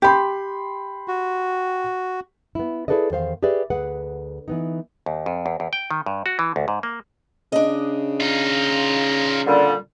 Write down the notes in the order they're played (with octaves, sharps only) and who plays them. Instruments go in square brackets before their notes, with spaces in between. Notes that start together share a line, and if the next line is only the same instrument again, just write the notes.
[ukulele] G4 [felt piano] G5 B5 C6
[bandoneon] F#4
[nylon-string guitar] B3 E4
E4 G#4 A4 B4 D5 D#5
E2 D#3 C5 F5
G4 G#4 B4 D5 E5
D2 G#4 B4 F#5
E3 B3 D#4
[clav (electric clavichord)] D#2
F2
E2
E2
G5
D#3
G2
F#4
E3
D2
G#2
A#3
[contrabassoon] C#3 [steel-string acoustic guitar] D4 D#5
[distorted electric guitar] D#4 F4
[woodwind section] A#2 D3 G3